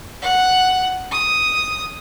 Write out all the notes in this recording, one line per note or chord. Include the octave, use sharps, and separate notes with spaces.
F#5
D#6